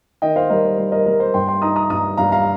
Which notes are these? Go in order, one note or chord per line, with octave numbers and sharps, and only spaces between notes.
D#3 D#5 G5
C5 F5
G3 A#4 D#5
C5
G3 C5
A#4 D#5
G3 A#4
C5
G2 G5 C6
G5 C6
D#4 A#5 D#6
A#5 D#6
G2 A#5 D#6
G2 F5 A#5
F5 A#5